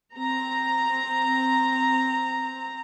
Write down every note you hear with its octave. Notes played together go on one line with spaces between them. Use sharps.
C4 A#5